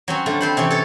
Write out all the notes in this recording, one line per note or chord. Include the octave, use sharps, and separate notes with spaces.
F#3 C4 C#4
D3 A3 F4
C4 C5 B5
C3 E3 C#4
A4 C#5